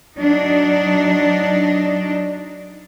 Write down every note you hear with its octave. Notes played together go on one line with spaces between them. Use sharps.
F#3 D4 D#4